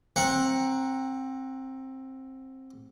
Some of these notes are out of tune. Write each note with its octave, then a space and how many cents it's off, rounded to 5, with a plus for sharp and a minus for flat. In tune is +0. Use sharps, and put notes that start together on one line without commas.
C4 +15 F#5 -10 A#5 +0